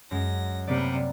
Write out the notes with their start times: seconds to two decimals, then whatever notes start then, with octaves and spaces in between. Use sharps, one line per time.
0.11 F#2 G#3 A#6
0.67 C3 G3 A#3 B3 D5